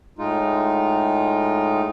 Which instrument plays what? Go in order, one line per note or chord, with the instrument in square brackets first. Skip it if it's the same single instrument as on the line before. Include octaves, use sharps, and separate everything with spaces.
[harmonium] A2 G#3 D#4 F4